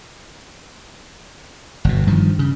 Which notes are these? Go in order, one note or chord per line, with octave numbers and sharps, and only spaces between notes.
G1 B2
G2 D#3 F3
C#3